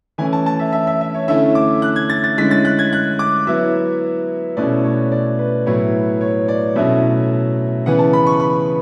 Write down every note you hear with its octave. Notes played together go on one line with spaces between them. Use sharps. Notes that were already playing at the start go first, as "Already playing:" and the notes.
E3 A3 C#4 E4 G#5
A5
A5
E5
E5
E5
E5
C#5
D3 A3 C#4 E4 E5
D6
F#6
G#6
A6
A6
D3 G#3 C#4 E4 B6
A6
F#6
G#6
F#6
D6
F#3 B3 E4 E5
B2 A3 C#4 E4 D5
C#5
D5
B4
A2 F#3 B3 E4 C#5
C#5
D5
B2 F#3 A3 C#4 E4 E5
C#3 E3 B3 F#5
A5
B5
C#6
B5